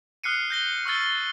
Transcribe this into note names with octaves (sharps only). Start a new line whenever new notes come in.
D#6 F6 F#6 C7 C#7 D#7
G6 A#6 G7
C#6 E6 F6 A6